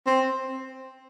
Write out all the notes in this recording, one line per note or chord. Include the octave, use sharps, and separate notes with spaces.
C4